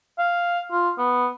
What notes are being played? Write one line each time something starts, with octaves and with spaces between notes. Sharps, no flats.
F5
F4
B3